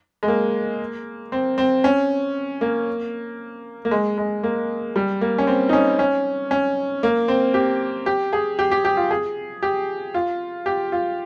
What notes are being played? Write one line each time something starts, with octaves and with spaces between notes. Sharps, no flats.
G#3
A#3
C4
C4
C#4
A#3
A#3
G#3
G#3
A#3
G3
A#3
C#4
C4
D#4
C#4
C#4
C#4
A#3
C4
G4
G4
G#4
G4
G4
G4
F4
G#4
G4
F4
G4
F4